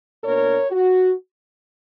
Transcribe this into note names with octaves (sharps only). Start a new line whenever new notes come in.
B2 A#3 D4 A#4 C#5
F#4